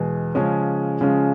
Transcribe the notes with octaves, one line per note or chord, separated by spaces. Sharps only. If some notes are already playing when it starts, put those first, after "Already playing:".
Already playing: E2 B2 G#3
C#3 F3 G#3 C#4
C#3 F3 G#3 C#4